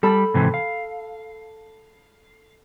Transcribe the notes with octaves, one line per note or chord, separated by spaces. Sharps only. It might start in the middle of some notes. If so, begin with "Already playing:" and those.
G3 A4 B5
G#2 C3 E3
F5